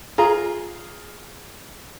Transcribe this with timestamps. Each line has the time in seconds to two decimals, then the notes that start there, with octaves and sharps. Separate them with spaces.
0.18 F4 G#4 A#5